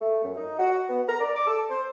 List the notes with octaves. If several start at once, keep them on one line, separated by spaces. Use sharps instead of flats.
A3
F#2
D#4
F#4
B3
A#5
D5
D6
A4
C5